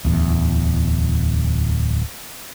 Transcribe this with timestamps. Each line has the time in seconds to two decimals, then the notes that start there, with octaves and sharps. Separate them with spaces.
0.04 D1 E2